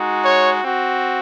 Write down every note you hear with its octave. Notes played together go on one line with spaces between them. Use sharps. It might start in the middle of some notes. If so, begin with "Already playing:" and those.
Already playing: G#3 D#4 F#4
C#5
C4 F#4